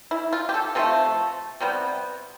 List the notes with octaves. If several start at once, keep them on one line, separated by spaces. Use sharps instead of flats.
E4
F4
G4
A4
C3 F3 A3 A4
C3 G3 B3